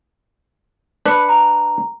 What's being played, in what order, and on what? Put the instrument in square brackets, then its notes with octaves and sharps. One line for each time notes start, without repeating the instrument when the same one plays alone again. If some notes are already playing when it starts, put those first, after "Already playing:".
[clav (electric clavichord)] D4 B4 [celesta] B5 C#7
[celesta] A#5